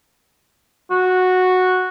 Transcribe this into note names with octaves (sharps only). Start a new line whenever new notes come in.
F#4